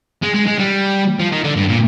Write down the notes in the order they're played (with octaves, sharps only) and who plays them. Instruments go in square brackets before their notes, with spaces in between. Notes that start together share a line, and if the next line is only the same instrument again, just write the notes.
[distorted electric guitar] G#3
G#3
G#3
G3
F3
D#3
D3
G2
A#2